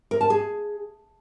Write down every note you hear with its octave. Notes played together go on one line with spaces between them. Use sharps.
A#4
A5
G#4